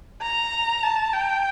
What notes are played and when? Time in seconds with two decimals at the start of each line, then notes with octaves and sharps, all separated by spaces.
0.22 A#5
0.83 A5
1.13 G5